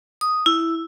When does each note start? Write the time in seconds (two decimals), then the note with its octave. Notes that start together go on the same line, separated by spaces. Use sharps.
0.21 D#6
0.46 E4